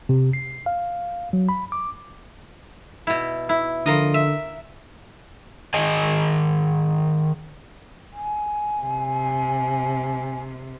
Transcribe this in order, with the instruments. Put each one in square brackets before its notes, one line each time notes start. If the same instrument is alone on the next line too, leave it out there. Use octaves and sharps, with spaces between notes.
[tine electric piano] C3
C7
F5
F#3
B5
D6
[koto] B2 E4
E4
[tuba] D3 [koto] F3 A#4 D#5
[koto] E5
[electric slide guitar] D#3 G#4 D#5 G#5 A5
[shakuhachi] G#5
[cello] C3